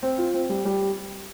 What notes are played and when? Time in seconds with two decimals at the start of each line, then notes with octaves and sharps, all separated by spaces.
0.02 C4
0.18 F4
0.34 C4
0.49 G3
0.65 G3